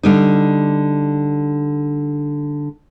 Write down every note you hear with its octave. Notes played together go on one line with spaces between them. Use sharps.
D3 G3 D#4